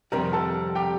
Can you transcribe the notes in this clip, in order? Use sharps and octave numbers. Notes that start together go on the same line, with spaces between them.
F2 C3 D#3 G3 A#4 A#5
A4 A5
G4 G5